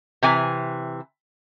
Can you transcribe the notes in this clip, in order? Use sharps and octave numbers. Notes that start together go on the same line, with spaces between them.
C3 E3 G#5